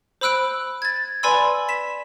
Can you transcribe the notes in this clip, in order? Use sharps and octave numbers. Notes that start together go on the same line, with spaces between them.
C5 B5 E6 F#6 D7
G#6 A6
B4 D5 G#5 B5 C6 E6
B6 E7